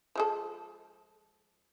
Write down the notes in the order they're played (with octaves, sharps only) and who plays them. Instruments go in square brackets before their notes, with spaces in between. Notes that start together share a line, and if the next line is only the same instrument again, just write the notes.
[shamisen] F3 G#3 A4